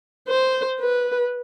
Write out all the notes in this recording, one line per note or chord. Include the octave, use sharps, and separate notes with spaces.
C5
B4